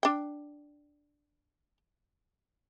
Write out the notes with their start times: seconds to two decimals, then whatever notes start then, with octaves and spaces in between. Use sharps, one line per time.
0.03 D4 G5